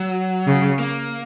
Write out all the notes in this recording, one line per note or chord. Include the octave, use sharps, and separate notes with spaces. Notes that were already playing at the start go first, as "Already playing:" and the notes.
Already playing: F#3
C#3
A#3